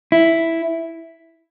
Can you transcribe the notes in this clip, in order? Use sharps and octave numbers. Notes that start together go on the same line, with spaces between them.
E4